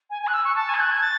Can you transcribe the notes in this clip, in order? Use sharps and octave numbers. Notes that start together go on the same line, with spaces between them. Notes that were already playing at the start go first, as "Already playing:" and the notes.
G#5
G#5
F#6
E6
C#6
A5
G#5
G#6
F#6
G#6
A6